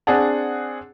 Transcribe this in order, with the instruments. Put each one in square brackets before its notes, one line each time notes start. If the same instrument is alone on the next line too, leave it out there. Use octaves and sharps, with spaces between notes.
[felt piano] C4 D4 G#4 F#5 A5